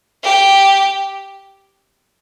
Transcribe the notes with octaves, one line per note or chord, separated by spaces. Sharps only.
G4